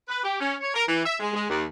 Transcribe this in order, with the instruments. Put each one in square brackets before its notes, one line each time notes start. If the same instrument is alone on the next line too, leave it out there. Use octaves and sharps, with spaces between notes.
[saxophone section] B4
G4
C#4
C#5
A#4
E3
E5
G#3
G#3
D#2